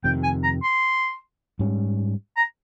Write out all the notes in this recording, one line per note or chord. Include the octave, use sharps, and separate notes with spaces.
F2 C3 D#3 G5
G#5
A#5
C6
G#2 G3 C#4
A#5